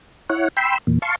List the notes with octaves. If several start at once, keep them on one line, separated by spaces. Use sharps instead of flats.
E4 C#5 F#5
G5 B5 C6 E6
E2 A#2
F5 A5 C6 C#6